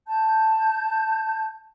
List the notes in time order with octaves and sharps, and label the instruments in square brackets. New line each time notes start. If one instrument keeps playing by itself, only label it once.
[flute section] A5 G6